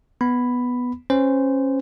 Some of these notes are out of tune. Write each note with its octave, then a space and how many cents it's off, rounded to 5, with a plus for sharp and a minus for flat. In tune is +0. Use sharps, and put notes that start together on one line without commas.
B3 +0 B5 +5
C#4 -25 C5 -20